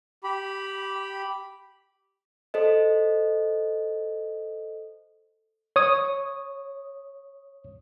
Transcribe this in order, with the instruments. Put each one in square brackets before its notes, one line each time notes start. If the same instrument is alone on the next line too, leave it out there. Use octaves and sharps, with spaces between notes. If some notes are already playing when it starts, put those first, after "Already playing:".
[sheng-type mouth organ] G4 B5
[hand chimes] A4 C5 D#5
[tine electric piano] C#5 D#6